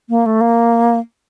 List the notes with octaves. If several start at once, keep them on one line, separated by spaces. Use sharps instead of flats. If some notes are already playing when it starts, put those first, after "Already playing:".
A#3
A3
A#3